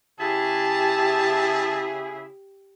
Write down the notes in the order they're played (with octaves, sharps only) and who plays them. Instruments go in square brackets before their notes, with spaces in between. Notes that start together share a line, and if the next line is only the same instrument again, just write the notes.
[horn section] C#3 E4 G#4 [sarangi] G4 [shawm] A5